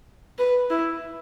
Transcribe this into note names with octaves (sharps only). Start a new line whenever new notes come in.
B4
E4